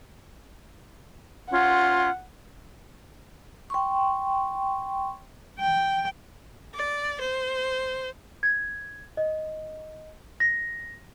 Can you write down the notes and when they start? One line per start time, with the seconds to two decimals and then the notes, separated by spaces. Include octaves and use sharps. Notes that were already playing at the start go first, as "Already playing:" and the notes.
1.51 C#4 F4 F#5 C6
3.70 G5 C6 C#6
5.60 G5
6.75 D5
7.21 C5
8.43 G#6
9.17 D#5
10.40 A#6